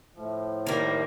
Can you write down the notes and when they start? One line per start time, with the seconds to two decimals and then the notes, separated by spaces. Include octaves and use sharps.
0.16 A2 F3
0.66 D#3 G3 A#3